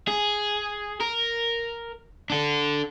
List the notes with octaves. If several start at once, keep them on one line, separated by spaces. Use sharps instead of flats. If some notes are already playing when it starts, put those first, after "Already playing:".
G#4
A#4
D4 A4